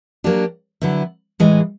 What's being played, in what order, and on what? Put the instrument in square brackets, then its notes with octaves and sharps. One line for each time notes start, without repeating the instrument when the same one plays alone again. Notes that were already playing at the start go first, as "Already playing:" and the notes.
[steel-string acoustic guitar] F#3 A#3 D4 G4
D3 F#3 B3 E4
A2 E3 G#3